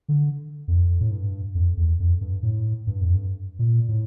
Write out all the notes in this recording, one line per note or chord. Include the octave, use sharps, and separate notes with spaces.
D3
F2
A2
G2
F2
E2
F2
G2
A2
G2
F2
G2
A#2
A2